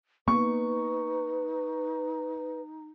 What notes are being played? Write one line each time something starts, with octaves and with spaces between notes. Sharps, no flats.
A#3 B3 D#4 B4 C#6